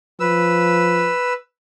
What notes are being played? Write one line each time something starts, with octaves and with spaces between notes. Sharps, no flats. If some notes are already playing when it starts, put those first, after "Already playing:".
F3 B4 E6